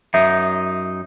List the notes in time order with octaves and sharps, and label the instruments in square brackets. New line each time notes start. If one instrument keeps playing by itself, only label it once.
[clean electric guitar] F#2 D#4 [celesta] E5